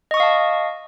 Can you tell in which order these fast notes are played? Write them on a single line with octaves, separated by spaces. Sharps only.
D#5 C#6 D#6 F5 A5